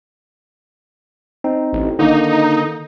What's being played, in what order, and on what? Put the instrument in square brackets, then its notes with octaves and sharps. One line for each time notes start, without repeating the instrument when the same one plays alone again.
[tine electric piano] C4 D#4
[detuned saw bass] A1
[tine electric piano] D3 D#3 A#3 [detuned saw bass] D#4